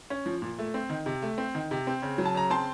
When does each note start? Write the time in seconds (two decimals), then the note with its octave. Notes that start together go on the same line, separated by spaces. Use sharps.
0.10 C#4
0.26 F3
0.42 A#2
0.59 A3
0.74 C4
0.90 D#3
1.06 C3
1.22 A3
1.38 C4
1.55 D#3
1.71 C3
1.87 C4
2.02 C#3
2.18 F#3
2.25 A5
2.35 C#3 A#5
2.50 C4 A5 C6